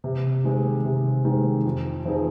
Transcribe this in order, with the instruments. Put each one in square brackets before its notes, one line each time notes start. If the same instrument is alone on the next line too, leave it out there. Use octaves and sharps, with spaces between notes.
[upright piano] C3
D#3 G#3 C4
C3
D#3 G#3 C4
F2
F3 C4 D#4 G#4